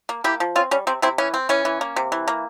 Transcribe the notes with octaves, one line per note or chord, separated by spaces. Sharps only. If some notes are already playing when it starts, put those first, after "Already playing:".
A#3
A#3 E4 G4
F3
C4 C#4 F4
G3 C#4
C3 C4
C3 C4 E4
E3 C#4
C4
E3 C#4
E3
A#3
C3
E3
A#3